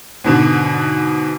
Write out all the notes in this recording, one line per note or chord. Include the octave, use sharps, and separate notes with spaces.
G#2 B2 D3